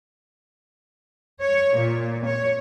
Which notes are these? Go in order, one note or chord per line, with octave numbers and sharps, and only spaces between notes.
C#5
A#2
C#5